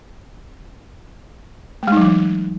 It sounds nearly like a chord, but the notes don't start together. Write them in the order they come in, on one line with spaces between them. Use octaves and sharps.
A3 G#3 D#4 F#3 E3